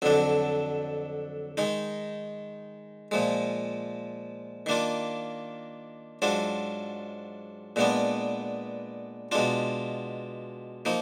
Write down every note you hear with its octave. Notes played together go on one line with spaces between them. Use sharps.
F2 D3 F#3 D4
D#3 G#3 D#4
A#2 F3 G#3
D#3 A#3 D4 F4
G#2 F#3 D4 F4
A#2 G#3 B3 D4
B2 G#3 D4 F4
F3 A#3 D#4